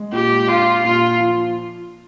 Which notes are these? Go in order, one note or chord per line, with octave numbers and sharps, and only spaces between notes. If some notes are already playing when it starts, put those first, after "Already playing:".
Already playing: G#3
A#2 G4
D4 F4
A#2 F4
F3